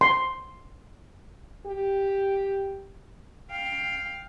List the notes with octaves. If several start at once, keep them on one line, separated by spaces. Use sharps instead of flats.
C6
G4
F5 G5